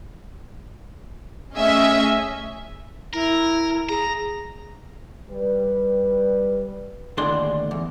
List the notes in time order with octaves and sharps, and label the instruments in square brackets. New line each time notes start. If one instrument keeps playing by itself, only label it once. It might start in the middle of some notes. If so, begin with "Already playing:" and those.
[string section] A3 C#4 G#4 D#5 E5 G#5
[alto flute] E4 [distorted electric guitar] A#4
[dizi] G#4 [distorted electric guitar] A#5
[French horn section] G3 B4
[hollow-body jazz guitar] D#2 A2 D3 D4 G#4 C6
E2